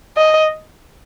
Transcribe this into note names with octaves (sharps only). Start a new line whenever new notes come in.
D#5